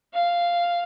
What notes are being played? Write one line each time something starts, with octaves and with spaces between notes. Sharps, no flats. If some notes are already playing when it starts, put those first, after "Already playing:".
F5